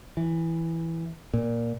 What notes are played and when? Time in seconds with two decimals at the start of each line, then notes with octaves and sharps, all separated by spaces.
0.17 E3
1.34 A#2